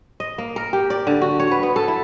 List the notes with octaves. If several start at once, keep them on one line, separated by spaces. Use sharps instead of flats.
D#5
A#3
A#4
G4
D5
D3
F#4
C#5
B4
B3
A4
E4